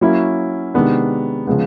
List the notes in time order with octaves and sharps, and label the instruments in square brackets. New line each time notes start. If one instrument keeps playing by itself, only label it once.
[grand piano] F#3 A#3 C#4 E4
C3 D#3 G#3 B3 D4
C#3 F3 G#3 B3